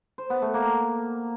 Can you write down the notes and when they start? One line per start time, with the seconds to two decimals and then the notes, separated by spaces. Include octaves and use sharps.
0.18 C5
0.30 B3
0.42 A3
0.54 A#3